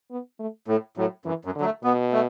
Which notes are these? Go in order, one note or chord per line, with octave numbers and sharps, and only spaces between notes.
B3
A3
A2 A3
A2 F#3
F#2 E3
F#2
D3
F#3
A3
B2 B3
A3